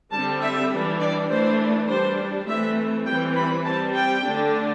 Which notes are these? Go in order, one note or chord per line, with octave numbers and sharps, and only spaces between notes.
D3 G3 C4 A5
E5
E3 G3 D4
D5
E3 A3 D4 C5
G3 D4 C5
E3 A3 C4 E5
E3 G3 C4 G5
B5
G3 C4 A5
G5
D3 A3 D4